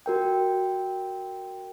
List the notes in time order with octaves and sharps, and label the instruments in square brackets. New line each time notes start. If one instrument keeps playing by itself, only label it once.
[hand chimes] F#4 A#4 G5